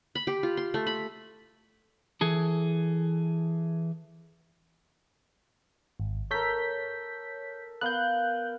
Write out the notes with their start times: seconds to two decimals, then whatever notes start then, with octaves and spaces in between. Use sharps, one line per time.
0.15 B5
0.27 G4
0.43 F4
0.57 C6
0.74 A3
0.87 B5
2.21 E3 G#4 A4
6.00 G#1
6.31 A4 A#4 C#5 G6 B6
7.81 B3 A#4 F5 F#6 G6